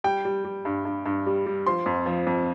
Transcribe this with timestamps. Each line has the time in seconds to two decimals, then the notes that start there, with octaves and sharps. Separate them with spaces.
0.04 G3 G5
0.25 G3
0.44 G3
0.65 G2
0.85 G2
1.06 G2
1.26 G3
1.46 G3
1.67 F3 C6
1.86 F2
2.06 F3
2.27 F2